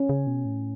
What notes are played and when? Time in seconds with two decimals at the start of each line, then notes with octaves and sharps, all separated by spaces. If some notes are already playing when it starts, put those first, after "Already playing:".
Already playing: C#4
0.09 C#3
0.27 B2
0.45 A2